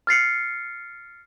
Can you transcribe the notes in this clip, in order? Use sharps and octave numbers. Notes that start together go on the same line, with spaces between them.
F6 A6 C7 C#7